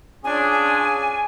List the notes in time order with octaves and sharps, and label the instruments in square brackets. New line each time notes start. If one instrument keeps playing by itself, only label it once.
[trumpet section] C#4 D4 F4 [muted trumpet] G#4 [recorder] G#5